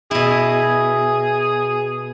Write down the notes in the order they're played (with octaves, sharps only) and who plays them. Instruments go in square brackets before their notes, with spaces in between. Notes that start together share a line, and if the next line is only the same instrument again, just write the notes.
[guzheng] B2 E4 [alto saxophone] G#4